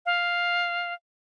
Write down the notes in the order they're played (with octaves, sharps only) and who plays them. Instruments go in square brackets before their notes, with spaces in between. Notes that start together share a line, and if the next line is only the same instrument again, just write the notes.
[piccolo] F5